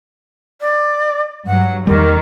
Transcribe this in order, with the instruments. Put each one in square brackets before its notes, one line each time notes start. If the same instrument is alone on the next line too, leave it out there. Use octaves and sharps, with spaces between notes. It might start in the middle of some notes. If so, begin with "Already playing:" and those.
[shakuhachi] D5
[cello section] G2 F#3 [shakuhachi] F#5
[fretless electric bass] E2 G3 [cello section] D#3 [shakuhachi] A#3